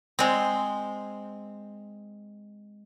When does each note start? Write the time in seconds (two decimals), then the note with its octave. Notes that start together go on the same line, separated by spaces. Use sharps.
0.19 G#3 C4